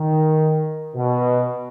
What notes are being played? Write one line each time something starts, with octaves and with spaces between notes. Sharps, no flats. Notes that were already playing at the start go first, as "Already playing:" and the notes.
Already playing: D#3
B2